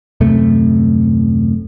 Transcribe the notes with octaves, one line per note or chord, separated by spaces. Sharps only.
D#1 F#2 C3 A3